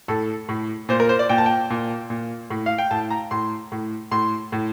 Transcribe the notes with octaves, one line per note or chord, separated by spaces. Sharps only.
A2 A4
A2
A#2 C5
A#4
C5
D5
A#2 G5
A5
G5
A#2
A#2
A2
F5
G5
A2 A5
A#5
A2 C6
A2
A2 C6
A2